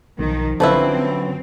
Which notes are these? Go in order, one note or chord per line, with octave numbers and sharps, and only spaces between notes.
B1 D#3 F3
F#2 D3 F3 F#3 C4 E4 B4